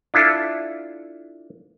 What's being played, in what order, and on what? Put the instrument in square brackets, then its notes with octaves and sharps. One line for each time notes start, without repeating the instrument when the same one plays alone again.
[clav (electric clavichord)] D4 E4 F4 A4